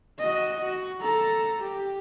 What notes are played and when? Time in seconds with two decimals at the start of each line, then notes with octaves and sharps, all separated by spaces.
0.19 F#4 D#5
0.61 F#4
1.01 A4 A#5
1.60 G4